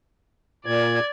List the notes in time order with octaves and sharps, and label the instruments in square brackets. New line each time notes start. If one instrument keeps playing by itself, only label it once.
[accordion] A#2 [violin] D5 G#6